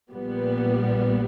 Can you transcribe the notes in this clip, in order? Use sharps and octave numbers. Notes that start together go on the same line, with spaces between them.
A#1 A#2 G3 B3